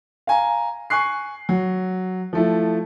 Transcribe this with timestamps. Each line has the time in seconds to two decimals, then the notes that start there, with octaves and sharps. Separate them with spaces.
0.27 F5 G#5 A#5
0.90 G#5 C#6 F#6 C7
1.49 F#3
2.33 F3 A3 E4